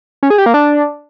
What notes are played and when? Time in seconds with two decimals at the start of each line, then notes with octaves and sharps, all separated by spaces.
0.23 C#4
0.30 G#4
0.38 G4
0.46 A#3
0.54 D4